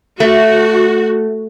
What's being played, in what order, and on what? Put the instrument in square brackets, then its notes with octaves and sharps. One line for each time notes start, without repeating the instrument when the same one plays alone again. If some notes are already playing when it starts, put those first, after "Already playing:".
[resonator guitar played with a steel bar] A3 [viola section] F#4